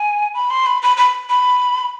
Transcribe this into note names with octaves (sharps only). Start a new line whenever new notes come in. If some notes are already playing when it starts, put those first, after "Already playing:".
Already playing: G#5
B5
C6
B5
B5
B5
B5